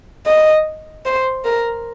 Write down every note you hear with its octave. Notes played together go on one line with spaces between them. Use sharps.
D#5
C5
A#4